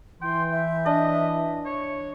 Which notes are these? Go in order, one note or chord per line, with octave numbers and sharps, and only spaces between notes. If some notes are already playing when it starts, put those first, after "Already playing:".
E3 G5 C6
E5
D4 D#5
C#5